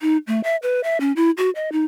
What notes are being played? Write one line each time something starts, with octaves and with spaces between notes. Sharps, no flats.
D#4
A3
E5
B4
E5
C#4
E4
F#4
D#5
D#4